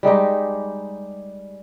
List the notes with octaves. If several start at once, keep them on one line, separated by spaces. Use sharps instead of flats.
G3 G#3 D#4 G4